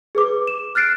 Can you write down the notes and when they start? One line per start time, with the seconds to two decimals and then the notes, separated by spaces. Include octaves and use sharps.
0.15 G#4 B4 D6
0.47 E7
0.75 F6 F#6 A6 C7 D7